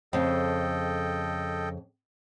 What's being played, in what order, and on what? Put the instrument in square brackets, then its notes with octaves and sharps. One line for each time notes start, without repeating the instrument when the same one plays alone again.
[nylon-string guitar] F2 C#3 [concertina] A4 D#5 G5